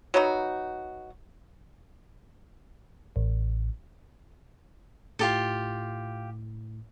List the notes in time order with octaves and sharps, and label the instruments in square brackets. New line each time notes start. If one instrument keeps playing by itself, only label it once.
[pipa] F#3 B3 D#4 F#4
[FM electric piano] A1
[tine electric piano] A2 [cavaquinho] F4 G4 A4